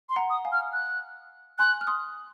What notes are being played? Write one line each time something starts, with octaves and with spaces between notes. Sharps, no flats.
C6
F#5 A#5
D#6
F5 G#5
F6
F#6
G#5 C6 F#6
F6
C6 D#6